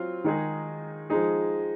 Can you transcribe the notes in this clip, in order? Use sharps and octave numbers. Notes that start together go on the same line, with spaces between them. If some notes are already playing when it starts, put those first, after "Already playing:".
Already playing: F#3 C4 F4
D#3 G#3 D#4 G#4
F3 G#3 D#4 G#4